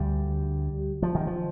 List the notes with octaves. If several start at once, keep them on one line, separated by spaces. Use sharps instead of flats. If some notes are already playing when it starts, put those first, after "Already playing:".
Already playing: D2 D3 G3
F3
D#3
F3